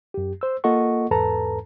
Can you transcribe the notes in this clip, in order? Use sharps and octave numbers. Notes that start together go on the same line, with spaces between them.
F#2 G4
C5 E6
A#3 F4 A4 D#5 F#5 C#6
E2 G#2 A4 B4 A5 A#5